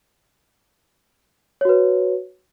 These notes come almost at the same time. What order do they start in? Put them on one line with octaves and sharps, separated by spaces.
C#5 F#4 B4